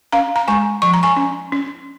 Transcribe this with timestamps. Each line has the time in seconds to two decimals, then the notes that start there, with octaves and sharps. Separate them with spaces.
0.12 C#4 F5 A#5
0.36 A#5
0.48 G#3 G#5 C#6
0.82 F3 C#6
0.94 A#5
1.03 G#5 C#6
1.17 C#4
1.52 C#4